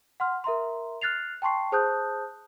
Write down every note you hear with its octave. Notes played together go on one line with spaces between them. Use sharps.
F#5 C6 F6
A#4 E5 A#5 C6
F6 F#6 A6 C7 F7
G5 A5 C6 C#6 C7
G#4 C5 A5 D#6 F#6 G6